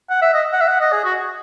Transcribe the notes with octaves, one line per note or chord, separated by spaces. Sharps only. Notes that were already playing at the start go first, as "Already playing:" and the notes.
F#5
E5
D#5
F#5
E5
F#5
D#5
G#4
F#4